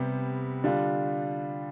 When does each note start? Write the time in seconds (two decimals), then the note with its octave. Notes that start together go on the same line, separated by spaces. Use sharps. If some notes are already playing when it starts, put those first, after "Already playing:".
Already playing: C3 G3 B3
0.64 D3 G3 D4 F4